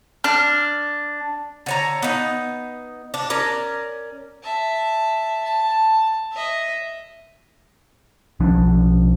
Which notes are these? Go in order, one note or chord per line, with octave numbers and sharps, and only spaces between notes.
D4 F6
D3 C#5 A#5
B3 D#4
D4
C#4 A#4 D5
E5 A5
A5
D#5 E5
B1 F3 C#4 D4